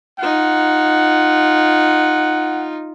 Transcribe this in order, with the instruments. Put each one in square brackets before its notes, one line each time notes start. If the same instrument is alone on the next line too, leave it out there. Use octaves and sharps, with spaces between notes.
[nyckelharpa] D#4 F4 [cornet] F#5